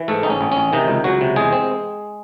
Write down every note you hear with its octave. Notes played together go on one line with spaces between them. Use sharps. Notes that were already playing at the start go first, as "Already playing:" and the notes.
Already playing: E3
G#2 A3 A4
A1 D#4
C#4
A1
A1 C#4
C3 D#3 D#4
C#2
C#2 F#3 F#4
C3
E2 G#3 G#4
C4